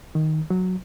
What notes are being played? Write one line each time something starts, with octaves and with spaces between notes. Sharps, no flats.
D#3
F#3